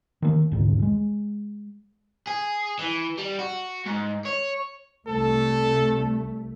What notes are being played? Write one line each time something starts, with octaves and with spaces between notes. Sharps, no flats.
D#3 A#3
D#1 C2 G#2 D3
G#3
G#4
E3
G3
F#4
G#2
C#5
C2 A3 A4